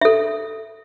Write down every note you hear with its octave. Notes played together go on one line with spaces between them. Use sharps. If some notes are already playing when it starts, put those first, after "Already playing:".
A4 E5